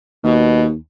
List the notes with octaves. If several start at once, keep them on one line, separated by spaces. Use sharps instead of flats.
D#2 B2